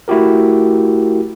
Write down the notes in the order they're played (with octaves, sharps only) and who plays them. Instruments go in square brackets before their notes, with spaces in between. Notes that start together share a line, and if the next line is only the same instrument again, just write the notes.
[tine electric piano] A3 E4 F#4 G4 A#4